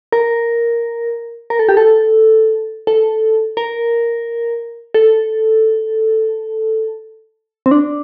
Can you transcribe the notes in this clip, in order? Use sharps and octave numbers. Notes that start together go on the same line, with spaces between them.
A#4
A#4
A4
G4
A4
A4
A#4
A4
C4
D4